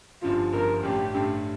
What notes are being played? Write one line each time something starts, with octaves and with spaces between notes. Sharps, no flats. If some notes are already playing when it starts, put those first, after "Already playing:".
G1 G2 D3 F3 F4
G1 G2 D3 F3 A#4
A1 G2 D3 A3 D4 G4
A1 G2 D3 A3 D4